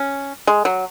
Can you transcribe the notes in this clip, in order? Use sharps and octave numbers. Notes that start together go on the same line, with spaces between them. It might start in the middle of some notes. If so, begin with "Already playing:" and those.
Already playing: C#4
G#3
F#3